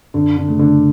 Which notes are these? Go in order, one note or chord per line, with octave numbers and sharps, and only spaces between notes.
F#2 D3
D3
C#3 F#3 A3
D3